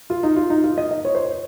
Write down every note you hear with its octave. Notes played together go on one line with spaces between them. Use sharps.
F4
D#4
F4
D#4
F4
D#5
D#5
C#5
C5
C#5